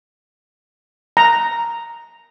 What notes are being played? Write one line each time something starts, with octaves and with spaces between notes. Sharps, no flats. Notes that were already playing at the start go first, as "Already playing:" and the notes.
A#5